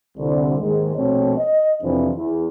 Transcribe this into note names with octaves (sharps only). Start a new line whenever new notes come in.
C2 D3
D#2 G#2 D#3 G#3
A#1 B2 A3 C4 C#5
D#5
F2 C3 E3 F3 C4 D4
E2